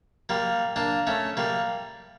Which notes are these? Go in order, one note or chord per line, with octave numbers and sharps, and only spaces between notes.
G3 A#3
A#3 D4
A3 C#4
G3 A#3